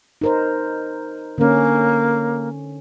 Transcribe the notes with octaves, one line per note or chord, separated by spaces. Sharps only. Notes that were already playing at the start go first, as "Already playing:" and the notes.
D#4 A#4 C5
D3 A#3 C#4